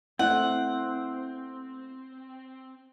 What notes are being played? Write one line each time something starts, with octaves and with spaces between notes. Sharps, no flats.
A3 B3 C4 E4 F#5